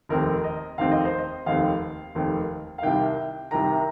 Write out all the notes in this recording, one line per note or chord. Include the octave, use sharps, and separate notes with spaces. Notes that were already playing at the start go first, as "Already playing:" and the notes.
F1 D#2 D#3 C4 A#4
D#5
F1 D#2 D#3 C4 F5
D#5
C5
D#5
F1 D#2 D#3 C4 F5
F1 D#2 D#3 C4
F5
C2 C3 D#3 G5
C2 C3 D#3 A#5